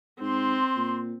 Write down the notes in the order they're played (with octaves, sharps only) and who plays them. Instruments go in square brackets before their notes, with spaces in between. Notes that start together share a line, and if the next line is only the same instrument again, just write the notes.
[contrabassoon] G#2 [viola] C4 [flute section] C6
[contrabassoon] A#2